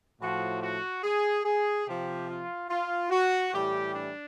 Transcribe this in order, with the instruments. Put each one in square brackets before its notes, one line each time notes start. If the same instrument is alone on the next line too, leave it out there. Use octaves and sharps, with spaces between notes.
[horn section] A2 F3 F#4
F#4
G#4
G#4
C3 F3 G4
F4
F4
F#4
A2 E3 G3 G4
D4